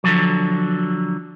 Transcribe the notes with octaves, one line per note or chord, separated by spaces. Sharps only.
D3 F3 F#3